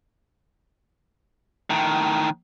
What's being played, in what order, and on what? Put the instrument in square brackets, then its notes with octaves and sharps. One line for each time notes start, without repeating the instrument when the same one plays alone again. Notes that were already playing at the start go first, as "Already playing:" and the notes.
[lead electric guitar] A2 D#3